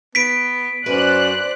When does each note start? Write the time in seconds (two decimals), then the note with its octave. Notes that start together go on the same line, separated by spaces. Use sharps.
0.15 B3 B6 D7
0.86 F#2 B4 C5 D5 F#6